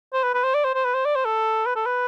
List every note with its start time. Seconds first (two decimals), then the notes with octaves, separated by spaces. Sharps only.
0.13 C5
0.23 B4
0.34 B4
0.44 C5
0.54 D5
0.64 C5
0.74 C5
0.85 B4
0.94 C5
1.05 D5
1.15 C5
1.25 A4
1.66 B4
1.76 A4
1.86 B4